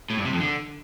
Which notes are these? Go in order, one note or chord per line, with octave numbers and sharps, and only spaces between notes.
A2
G2
C3
F2
D3